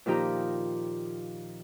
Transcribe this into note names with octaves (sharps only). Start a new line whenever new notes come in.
A#2 D#3 F3 D#4 G4 A#5